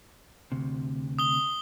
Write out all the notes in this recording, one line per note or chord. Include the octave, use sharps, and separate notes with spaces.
D2 C3
D#6 G7